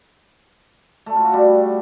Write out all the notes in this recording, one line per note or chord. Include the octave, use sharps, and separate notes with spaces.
A3
F4
F#4
G3